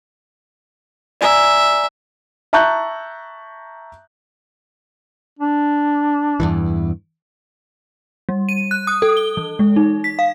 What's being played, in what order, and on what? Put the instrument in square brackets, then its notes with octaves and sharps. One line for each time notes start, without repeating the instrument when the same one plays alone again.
[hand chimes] D5 G#5 A#5 [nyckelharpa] E5
[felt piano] E5 A5 A#5 C#6 F#6 G6
[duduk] D4
[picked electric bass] E2 G2 E3
[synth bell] G3
D#7
F#6
D#6
A4
G7
E3
G#3
D#4
B6
F5